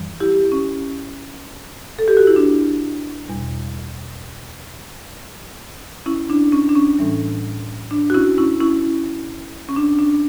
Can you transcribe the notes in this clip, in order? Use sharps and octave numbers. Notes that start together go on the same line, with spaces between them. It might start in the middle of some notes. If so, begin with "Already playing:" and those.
Already playing: F#2 E3 G3
E4 G4
C#4
A4
G4
F#4
E4
D4
E2 B2 G3
C#4 E4
D4
C#4
D4
C#4
A2 E3 G3
D4
F#4
C#4 E4
C#4 E4
C#4 E4
C#4
D4
D4